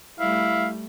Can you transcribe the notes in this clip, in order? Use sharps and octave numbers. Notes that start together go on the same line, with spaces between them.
G3 A3 E4 F5